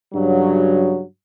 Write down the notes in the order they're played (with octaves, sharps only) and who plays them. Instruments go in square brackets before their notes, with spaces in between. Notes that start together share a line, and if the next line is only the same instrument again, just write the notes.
[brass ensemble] G2 C#3 F#3